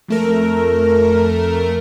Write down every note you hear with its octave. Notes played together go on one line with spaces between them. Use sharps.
F2 A3 A#4